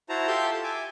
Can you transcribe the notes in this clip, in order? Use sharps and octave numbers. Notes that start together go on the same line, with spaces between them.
E4 F#4 C5 A5 A#5
F4 G4 A4 E5 C6 G6
A5
E5 G#5 D6